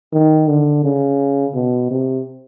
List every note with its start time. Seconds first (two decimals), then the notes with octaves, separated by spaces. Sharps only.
0.13 D#3
0.48 D3
0.84 C#3
1.55 B2
1.90 C3